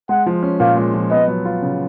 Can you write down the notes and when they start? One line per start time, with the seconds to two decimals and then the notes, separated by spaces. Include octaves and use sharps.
0.09 G#3 F#5
0.26 F3
0.43 C#4
0.60 A#2 F5
0.77 G#3
0.94 F3
1.11 B3 D#5
1.28 F#3
1.45 F4
1.62 C#3